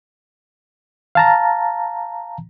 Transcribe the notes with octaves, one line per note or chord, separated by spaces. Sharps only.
F5 A5 A#5